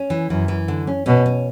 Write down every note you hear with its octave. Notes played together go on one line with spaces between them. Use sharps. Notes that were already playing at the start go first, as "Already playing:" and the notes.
Already playing: C#4
E3
F#2 E3
E3
D3
C#4
B2 C#4
C#4